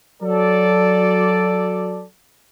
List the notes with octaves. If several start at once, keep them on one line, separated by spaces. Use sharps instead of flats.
F#3 A4 D5